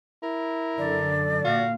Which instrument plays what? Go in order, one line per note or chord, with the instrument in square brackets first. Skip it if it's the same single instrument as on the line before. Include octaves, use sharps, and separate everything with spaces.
[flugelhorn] E4 [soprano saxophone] A#4
[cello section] F#2 D3 A4 [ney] D5
[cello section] A#2 [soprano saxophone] F#4 [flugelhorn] F5